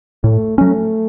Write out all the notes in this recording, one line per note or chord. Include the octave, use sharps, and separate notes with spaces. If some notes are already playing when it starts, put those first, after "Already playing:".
A2 A3
F#3 A3 C#4